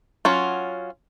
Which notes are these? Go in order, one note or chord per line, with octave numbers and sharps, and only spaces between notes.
F#3 C#4 F4